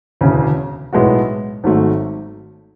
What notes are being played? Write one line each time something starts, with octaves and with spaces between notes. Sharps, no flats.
E1 D2 C#3
B1 A2 G#3 B3 F#4
G#1 G#2 F#3 A3